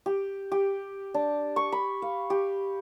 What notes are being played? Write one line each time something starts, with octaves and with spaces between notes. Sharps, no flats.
G4
G4
D4
C#6
B5
F5
G4